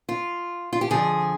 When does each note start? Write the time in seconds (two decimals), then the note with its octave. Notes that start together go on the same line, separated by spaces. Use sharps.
0.09 F4
0.73 F4
0.81 G4
0.90 F2 D3 F3 G#4